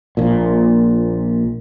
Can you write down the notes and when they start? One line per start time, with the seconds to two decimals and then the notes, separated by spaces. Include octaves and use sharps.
0.17 A#1 A#2